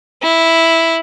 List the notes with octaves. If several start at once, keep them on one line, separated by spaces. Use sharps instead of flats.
E4